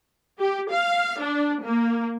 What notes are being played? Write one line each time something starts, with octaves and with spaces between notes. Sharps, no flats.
G4
F5
D4
A#3